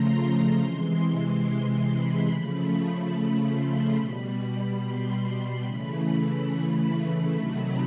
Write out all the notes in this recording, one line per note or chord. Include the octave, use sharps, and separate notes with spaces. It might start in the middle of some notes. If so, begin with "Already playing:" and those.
Already playing: C#3 F3 A3 A#5 C6
C3 E3 G#3 C6
B5
C#3 F3 A3
B5
C6
B2 G3 B5
B5
C6
C#3 E3 A3 B5
B5
C3 D#3 F#3 A3